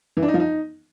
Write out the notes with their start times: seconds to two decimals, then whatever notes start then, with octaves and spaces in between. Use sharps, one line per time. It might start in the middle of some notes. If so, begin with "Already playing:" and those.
0.17 E3
0.22 D4
0.28 D#4
0.34 F3
0.40 D#4